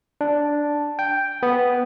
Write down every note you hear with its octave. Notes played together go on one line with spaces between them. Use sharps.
D4
G5
B3